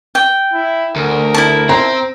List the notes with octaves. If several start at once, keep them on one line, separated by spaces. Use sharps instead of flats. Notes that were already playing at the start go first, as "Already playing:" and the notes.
G5
E4
D2 A#4
E4 A5
C4 C5 A#5